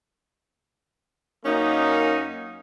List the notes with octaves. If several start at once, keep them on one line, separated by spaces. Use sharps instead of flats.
F#2 A#3 C#4 D#4